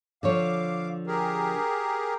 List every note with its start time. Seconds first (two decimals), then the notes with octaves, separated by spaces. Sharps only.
0.23 D3 F3 C#5 F5 D6
1.07 G4 G#4 A#4